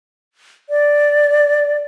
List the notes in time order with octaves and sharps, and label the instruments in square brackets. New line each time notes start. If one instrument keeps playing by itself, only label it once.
[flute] D5